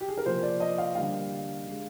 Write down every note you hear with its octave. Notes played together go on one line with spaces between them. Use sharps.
G4
G#4
A#4
C3 F3 A#3 C5
D5
D#5
F5
D3 G3 A#3 F5
D3 G#3